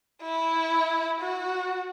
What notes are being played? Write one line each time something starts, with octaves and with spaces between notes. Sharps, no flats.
E4
F#4